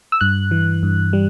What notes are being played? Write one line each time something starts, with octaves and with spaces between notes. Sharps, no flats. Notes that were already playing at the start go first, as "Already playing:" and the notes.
E6
G2 F#6
E3
G2
G3